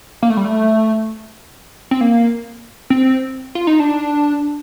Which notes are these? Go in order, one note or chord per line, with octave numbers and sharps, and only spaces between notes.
A#3
A3
G3
A3
C4
A#3
C4
F4
D#4
D4